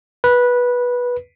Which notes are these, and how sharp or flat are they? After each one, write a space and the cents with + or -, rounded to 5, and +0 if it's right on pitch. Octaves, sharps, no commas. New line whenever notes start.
B4 -15